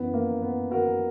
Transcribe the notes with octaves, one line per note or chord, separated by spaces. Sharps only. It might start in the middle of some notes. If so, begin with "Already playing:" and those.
Already playing: F#2 E3 B3
A#3
B3
F#4 A#4